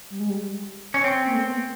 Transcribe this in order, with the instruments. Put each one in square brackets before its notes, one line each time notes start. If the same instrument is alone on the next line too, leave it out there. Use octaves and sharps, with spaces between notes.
[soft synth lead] G3
G#3
G3
[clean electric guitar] C#4
C4
[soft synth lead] A#3
A3
B3
B3